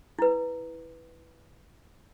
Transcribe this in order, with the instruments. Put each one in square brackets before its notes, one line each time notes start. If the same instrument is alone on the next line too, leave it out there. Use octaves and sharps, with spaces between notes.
[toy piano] E4 B4